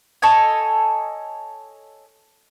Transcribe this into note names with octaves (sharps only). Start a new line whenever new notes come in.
A4 C#5 D#5 G#5